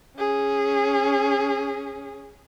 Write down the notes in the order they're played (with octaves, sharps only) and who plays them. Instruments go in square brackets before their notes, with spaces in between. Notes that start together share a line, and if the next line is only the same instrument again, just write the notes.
[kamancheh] C#4 G#4